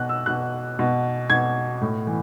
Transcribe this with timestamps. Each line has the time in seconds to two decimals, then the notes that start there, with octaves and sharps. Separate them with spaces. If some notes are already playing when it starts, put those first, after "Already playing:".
Already playing: B2 F#6
0.09 E6
0.26 B2 F#6
0.79 B2
1.30 B2 G#6
1.81 A2
2.07 E3